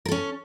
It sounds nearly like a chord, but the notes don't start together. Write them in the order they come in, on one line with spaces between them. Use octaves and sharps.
A#4 A4 C#4